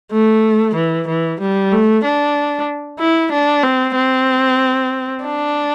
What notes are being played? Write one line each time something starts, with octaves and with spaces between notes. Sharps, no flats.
A3
E3
E3
G3
A3
D4
E4
D4
C4
C4
D4